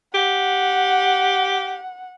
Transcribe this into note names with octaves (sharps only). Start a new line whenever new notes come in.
G4 F#5